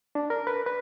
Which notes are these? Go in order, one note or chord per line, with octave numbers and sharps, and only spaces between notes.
D4
A#4
B4
B4